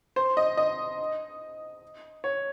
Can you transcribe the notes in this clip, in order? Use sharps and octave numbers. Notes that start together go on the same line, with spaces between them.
C5
D#5
D#5
C#5